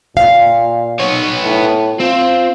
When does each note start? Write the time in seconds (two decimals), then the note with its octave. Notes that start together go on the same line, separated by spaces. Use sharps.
0.17 A#2 F5
1.00 B3 C#5
1.42 A2
2.00 C4 F4